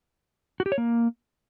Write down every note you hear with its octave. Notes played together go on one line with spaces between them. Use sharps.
F#4
G4
C#5
A#3